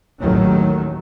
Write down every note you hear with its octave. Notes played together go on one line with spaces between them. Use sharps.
A1 D#2 D#3 F#3 A3